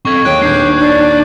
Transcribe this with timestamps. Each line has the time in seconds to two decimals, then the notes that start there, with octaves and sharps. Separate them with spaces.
0.05 C4 A4 C#6 G#6
0.25 D#2 G#4 C#5 G5 D6 F#6
0.42 D#1 D4 F6 G6 C7
0.80 D5